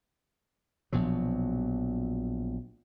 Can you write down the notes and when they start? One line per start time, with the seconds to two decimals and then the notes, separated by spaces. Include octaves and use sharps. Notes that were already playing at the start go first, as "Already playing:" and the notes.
0.93 A#1 B2 F3 F#3